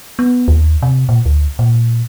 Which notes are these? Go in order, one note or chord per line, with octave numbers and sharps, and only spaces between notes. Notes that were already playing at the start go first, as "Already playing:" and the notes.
B3
D#2
C3
A#2
D2
A#2